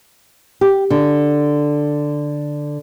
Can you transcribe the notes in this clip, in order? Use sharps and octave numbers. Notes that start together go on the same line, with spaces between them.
G4
D3